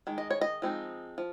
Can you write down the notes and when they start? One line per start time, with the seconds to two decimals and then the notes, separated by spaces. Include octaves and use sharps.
0.07 D#3 G#3
0.18 D#5
0.31 C#5
0.41 D#5
0.62 F3 G#3 C4 D#4
1.18 F3